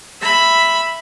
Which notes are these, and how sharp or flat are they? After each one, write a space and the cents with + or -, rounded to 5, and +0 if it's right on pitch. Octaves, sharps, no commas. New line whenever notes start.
E5 +0 B5 +0